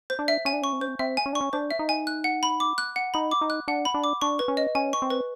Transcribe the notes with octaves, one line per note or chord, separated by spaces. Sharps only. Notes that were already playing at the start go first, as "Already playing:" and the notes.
C5
D4
E5
C#4 G#5
D4
C#4 C#6
C4
C#4 C5
C4
C4 E5
G#5
C#4
D4
C#6
C#4
D4 C5
E5
D#4
G#5
F#6
F#5
B5
D6
F#6
F#5
D#4 B5
D6
D#4
F#6
D4 F#5
B5
D4
D6
D4 C#6
B4
C#4
D#5
C#4 G#5
C#6
C4
B4